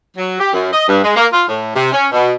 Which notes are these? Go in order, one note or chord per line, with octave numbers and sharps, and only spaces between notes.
F#3
G4
F#2
D#5
G2
G#3
A#3
F4
A2
C3
C#4
B2